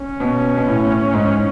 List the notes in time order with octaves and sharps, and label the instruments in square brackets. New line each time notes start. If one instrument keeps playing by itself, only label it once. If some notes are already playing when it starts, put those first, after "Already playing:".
Already playing: [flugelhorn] C#4
[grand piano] B2
B2
A2
G#2